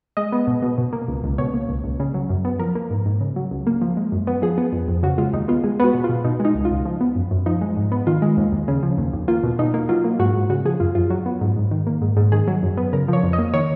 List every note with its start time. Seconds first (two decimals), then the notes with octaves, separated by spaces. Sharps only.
0.17 G#3 D#5
0.32 B3
0.47 B2
0.62 B2
0.78 B2
0.93 A#3
1.08 C#2
1.24 C#2
1.38 B2 C#5
1.54 A#3
1.69 C#2
1.84 C#2
2.00 C#3
2.14 F#3
2.29 F#2
2.45 B3
2.60 F3 A#4
2.75 A#3
2.90 G#2
3.06 G#2
3.21 C#3
3.36 F#3
3.51 C#2
3.67 A#3
3.81 F3
3.97 G#3
4.12 F#2
4.27 B3
4.42 F3 G#4
4.58 B3
4.73 F2
4.88 F2
5.03 C#3 F#4
5.18 G#3 F4
5.33 D#2 D#4
5.48 B3 F4
5.64 G#3 G#4
5.80 B3 F#4
5.94 B2
6.04 F4
6.09 B2
6.24 B2 D#4
6.40 G#3 D#4
6.55 C#2
6.65 F4
6.70 C#2
6.85 F3
7.00 B3
7.16 F#2
7.31 F#2
7.46 F3 D#4
7.61 G#3
7.76 G#2
7.92 B3
8.07 D#3 F4
8.22 G#3
8.37 D#2
8.52 D#2
8.68 C#3
8.83 F3
8.98 D#2
9.13 D#2
9.28 A#3 F4
9.44 B2
9.59 B2 D#4
9.74 A#3
9.89 F#3 F4
10.04 A#3
10.19 G#2 F#4
10.35 G#2
10.50 C#3 F#4
10.65 F3 G#4
10.80 F#2 F4
10.95 F#2 F4
11.10 F#3 F#4
11.26 B3
11.41 G#2
11.56 G#2
11.71 D#3
11.87 A#3
12.01 G#2
12.17 G#2
12.32 D#3 G#4
12.48 F#3
12.63 F#2
12.77 B3
12.93 C#3 A#4
13.08 F3 C#5
13.23 F2
13.33 D#5
13.38 A#3
13.54 D#3 C#5